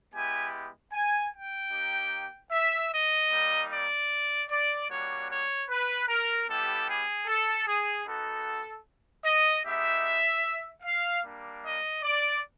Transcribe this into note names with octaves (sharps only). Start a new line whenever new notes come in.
G#3 B3 E4 G4 G#5
G#5
G5
A#3 D#4 G4
E5
D#5
G3 A#3 D#4
D5
D5
G3 A#3 D4 F#4 C#5
C#5
B4
A#4
G3 B3 E4 G4 A4
G#4
A4
G#4
B3 D#4 F#4 A4
D#5
G#3 B3 D#4 G4 E5
F5
G3 A#3 D4
D#5
D5